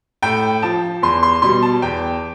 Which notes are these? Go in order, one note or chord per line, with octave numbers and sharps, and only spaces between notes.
A2 G5
F3 A5
E2 C6
C6
B2 G3 C6
A5
E2 G5